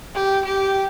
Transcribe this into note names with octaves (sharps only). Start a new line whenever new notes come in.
G4
G4